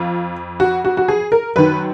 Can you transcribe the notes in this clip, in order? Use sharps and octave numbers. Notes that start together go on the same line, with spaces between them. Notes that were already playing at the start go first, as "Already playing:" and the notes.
Already playing: F2 F4
F#4
F#4
F#4
G#4
A#4
F#2 D#3 B4